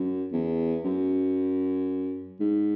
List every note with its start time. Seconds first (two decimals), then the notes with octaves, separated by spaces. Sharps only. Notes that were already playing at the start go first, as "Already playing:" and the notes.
Already playing: F#2
0.33 E2
0.85 F#2
2.40 G#2